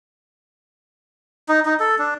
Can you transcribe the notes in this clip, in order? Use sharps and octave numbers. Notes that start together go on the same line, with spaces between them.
D#4
D#4
A4
D4